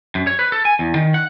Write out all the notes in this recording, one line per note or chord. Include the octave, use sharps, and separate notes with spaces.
F#2
C#5
B4
A4
G#5
E2
D#3
F#5